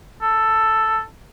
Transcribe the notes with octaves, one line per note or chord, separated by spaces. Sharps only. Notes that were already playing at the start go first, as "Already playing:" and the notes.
A4